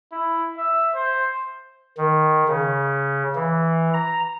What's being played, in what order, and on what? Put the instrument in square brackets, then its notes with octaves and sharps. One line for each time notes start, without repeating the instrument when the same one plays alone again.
[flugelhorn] E4
E5
C5
[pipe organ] D#3
C#3
E3
A#5